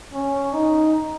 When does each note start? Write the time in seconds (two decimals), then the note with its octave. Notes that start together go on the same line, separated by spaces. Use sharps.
0.14 C#4
0.53 D#4